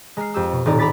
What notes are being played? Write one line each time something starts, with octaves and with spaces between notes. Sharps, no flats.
G#3 A#5 F6 C7
F2 G4 E6 F6
B2
D#1 A2 C4 D#4 D5 A#5
A#5 B5 D6 A6 B6